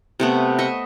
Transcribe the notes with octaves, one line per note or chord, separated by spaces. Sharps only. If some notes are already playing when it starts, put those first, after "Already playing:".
C3 A3 B3
D#5 E5 C#6